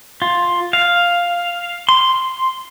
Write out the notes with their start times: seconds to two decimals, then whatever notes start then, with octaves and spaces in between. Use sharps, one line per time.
0.22 F4
0.73 F5
1.89 C6